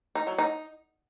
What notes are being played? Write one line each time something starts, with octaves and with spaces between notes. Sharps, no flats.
D#4
F#3
D#4